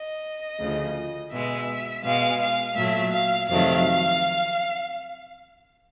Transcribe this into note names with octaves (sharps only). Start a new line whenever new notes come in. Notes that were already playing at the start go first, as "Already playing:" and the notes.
Already playing: D#5
D2 C#3 F3
B2 G#3 E5
B2 G#3 F5
F5
A#2 F#3 A3 E5
F5
F2 C3 D#3 F#3 A3 F5